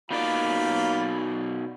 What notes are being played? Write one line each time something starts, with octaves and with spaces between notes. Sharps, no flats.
B2 A#3 D#4 F4 D5 B5